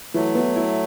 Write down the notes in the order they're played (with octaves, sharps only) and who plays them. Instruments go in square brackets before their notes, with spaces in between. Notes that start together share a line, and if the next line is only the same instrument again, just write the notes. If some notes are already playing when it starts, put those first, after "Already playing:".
[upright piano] E3 [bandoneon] F#3 A3
[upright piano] B3
E4